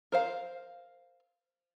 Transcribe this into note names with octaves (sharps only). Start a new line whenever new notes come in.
A#4 C5 F5